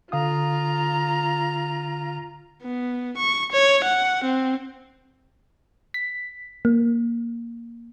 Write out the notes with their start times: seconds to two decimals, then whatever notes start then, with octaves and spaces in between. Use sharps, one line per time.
0.12 D3 F4 F5 A#5 D#6
2.63 B3
3.17 C#6
3.52 C#5
3.84 F#5
4.24 C4
5.94 B6
6.65 A#3